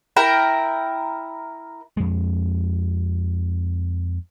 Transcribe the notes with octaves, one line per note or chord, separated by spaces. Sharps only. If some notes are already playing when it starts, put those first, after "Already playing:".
E4 A#4 G5
F2 G#3